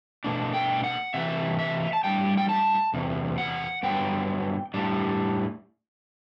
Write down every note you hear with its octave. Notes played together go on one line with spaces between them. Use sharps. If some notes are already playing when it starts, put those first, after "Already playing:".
B2 A3 D4
G5
F#5
C3 E3 A3 E5
E5
A5
A2 G3 D4 G5
G5
A5
E2 C3
F#5
G2 D3 F#3 B3 G5
A2 G3 D4